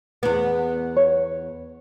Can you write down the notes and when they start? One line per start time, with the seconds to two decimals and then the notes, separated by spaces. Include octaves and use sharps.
0.23 E2 B3
0.96 C#5